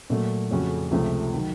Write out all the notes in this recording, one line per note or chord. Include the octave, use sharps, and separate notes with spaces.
A#2 F#3 A3
F2 C#3 A3 C#4 F#4
C#2 C3 F3 A3
D#3 F#3